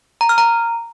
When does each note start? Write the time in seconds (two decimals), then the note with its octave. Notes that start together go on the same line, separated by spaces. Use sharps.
0.21 A#5
0.29 F6
0.38 A#5